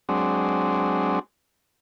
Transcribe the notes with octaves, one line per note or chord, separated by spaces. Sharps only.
F#3 G#3 C4 D4